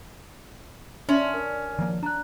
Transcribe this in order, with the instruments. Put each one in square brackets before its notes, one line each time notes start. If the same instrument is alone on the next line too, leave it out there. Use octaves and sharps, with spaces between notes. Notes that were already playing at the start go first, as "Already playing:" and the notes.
[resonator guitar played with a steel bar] C#4 [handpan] D4 [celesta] E5 C6 F#7
[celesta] A#4
[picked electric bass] D#3 F3 A#3
[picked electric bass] D4 [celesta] A#5 F#6